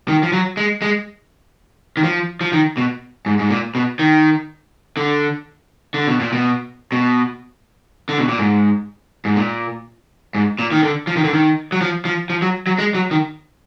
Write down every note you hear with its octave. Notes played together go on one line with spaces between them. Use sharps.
D#3
F3
F#3
G#3
G#3
D#3
F3
F3
D#3
B2
G#2
G#2
A#2
B2
D#3
D3
D3
B2
A#2
B2
B2
D3
B2
A#2
G#2
G#2
A#2
G#2
A#2
D#3
D3
F3
D#3
D3
D#3
F#3
F3
F3
F3
F#3
F#3
G#3
F#3
D#3